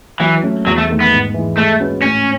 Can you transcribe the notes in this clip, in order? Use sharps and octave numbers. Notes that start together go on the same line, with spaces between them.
E3 F#3
A3 C#4
E2 F#3
A3
D#3 A3
B3
G#2
E3 G#3
G#3 A3
C#4 F#4 B4
A2 C#4